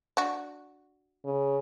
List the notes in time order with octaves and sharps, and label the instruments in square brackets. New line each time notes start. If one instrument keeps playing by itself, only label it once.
[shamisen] D4 F#4
[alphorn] C#3